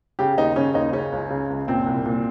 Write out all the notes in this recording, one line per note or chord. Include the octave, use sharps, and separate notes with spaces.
C#3 G4
D#2 D#4
C#3 C#4
D#2 D#4
C#3 C#4
C#2
C#3
C#2
A#2 C4
C2
A#2